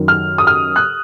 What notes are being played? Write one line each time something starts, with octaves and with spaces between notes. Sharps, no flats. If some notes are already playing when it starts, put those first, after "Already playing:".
Already playing: F#2 D#3
F6
D#6
F6
F#6